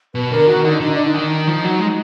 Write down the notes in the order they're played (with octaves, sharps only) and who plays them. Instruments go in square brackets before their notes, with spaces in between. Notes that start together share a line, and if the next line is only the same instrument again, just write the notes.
[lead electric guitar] B2 [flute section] B4
[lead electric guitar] D3 [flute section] A#4
[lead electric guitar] D#3 [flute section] F#4
[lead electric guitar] D3 [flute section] D#4
[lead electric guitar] D3 [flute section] D#4
[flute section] D4
D#4
[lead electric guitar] D#3
F3
F#3
G#3